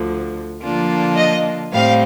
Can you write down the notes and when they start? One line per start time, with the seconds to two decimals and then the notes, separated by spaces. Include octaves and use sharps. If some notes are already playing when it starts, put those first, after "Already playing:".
Already playing: D2 D3 F3
0.62 D3 F3 A#3 D4 F4
1.16 D#5
1.72 A2 G3 C4 F5